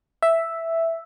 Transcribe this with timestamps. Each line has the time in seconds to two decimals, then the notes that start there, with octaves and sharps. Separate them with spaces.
0.22 E5